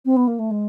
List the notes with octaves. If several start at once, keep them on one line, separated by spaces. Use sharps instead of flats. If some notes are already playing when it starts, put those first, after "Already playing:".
C4
B3
A#3
A3
G#3